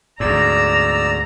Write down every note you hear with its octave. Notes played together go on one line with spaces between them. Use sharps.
D2 G#2 D5 A#5 E6